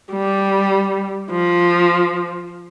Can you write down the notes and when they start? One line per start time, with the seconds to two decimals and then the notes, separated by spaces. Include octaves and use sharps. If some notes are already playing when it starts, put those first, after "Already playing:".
0.12 G3
1.31 F3